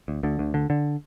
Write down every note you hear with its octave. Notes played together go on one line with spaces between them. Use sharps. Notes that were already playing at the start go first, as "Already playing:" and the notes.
D2
D2 D3
D2
D3
D3